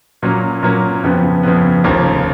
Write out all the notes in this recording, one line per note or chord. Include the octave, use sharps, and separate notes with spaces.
A#2 F#3 A#3 C#4
A#2 F#3 A#3 C#4
F2 C#3 F3 B3
F2 C#3 F3 B3
F1 D#2 C#3 F3 A#3